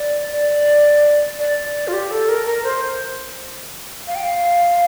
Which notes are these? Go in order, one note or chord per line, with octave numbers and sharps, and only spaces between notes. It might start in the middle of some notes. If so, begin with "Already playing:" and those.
Already playing: D5
D5
D5
F4
G4
A4
A#4
A#4
C5
F5
G5
F5